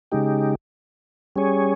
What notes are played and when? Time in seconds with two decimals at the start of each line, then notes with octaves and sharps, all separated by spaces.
0.12 C#3 G#3 D#4 G4
1.36 G3 C#4 G#4 C#5